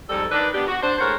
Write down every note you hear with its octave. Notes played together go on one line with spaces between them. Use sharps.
F2 G#2 G3 A4
D#3 D4 B4
B3 D4 G4
F#4
D4 C5
A2 G#3 A#4 C5 C#5 F#5